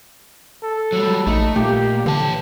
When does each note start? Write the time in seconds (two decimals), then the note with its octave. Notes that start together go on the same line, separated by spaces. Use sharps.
0.63 A4
0.92 F#3 G3
1.27 A#1 A3 D#4
1.56 A#2 A3 G4
2.06 D3 E3 A5